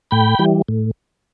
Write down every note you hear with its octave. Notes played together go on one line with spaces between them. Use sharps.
A2 G5 B5
E3 G3
A2